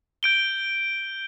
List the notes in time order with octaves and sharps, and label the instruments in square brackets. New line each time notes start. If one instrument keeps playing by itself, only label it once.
[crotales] G6 D7 G7